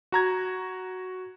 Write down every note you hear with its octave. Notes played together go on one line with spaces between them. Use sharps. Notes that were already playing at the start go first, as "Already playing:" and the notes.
F#4 A#5 G#6